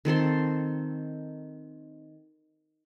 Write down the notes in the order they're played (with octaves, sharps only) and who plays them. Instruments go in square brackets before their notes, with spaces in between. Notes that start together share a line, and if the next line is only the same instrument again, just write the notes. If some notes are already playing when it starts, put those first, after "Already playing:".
[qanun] D#3 C4 A4 C6